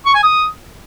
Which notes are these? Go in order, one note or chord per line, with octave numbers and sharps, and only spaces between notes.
C#6
G#5
D#6